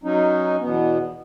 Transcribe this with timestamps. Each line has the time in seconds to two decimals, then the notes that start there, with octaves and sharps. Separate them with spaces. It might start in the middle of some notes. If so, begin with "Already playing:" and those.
0.04 F#3 C#4 D#4
0.60 E2 B2 B3